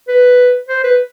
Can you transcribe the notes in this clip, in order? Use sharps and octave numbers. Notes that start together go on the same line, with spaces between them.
B4
C5
B4